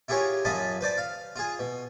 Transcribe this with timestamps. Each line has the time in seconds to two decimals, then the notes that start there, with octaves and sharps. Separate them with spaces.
0.08 E4 F4 G4 G#4 A#4 C#5
0.45 F#2 F4 D#5 G#5 A5 B5
0.81 B4 C5 D5 A5
0.97 F5
1.36 F4 G#4
1.59 B2